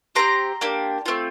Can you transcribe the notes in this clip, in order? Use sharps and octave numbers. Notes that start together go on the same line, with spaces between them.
C4 E4 G4 A#5 C6
A#3 D4 G4
A3 C4 F4